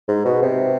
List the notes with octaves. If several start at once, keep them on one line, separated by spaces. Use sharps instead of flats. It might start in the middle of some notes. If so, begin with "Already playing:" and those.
G#2
B2
C3